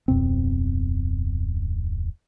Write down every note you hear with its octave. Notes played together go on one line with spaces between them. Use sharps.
D1 F2 B2 C4